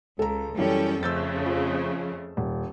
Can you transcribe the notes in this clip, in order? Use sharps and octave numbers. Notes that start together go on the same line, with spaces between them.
C#2 A4 A#5
F#2 E3 G3 C#4 A4 G5
F2 C#3 A3 E6 G6 A6
F3
D#1